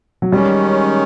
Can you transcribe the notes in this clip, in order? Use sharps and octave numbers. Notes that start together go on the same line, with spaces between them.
F#3
D#3 G3 G#3 C#4